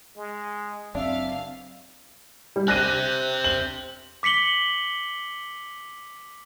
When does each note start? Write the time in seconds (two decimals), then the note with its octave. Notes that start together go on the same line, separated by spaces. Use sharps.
0.17 G#3
0.95 F#1 F#2 C4 D4 E5 F5
2.56 G3
2.68 C4 G4 F#6 A#6 D#7
3.44 F#7
4.23 D6 B6 C#7 F#7 G7